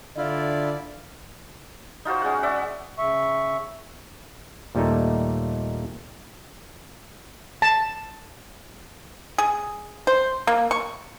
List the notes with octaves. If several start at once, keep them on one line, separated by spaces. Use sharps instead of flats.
D3 E4 F4 D5
D#4 F4 F#4 C5
G#3 C#4 G#4 F#5
D5 E5 F#5
C#3 E5 C#6
D#2 A#2 G3 A3 D#4 A4
A5
G#4
C5
A#3
C#6